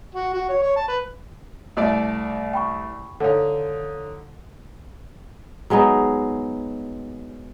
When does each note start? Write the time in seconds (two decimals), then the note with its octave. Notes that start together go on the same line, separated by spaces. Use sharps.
0.15 F#4
0.34 F#4
0.49 C#5
0.62 C#5
0.76 A5
0.89 B4
1.77 C2 A3 D5
2.53 G5 B5 C#6
3.20 D3 D#4 A4 C#5 F5
5.70 F#3 G#3 B3 D#4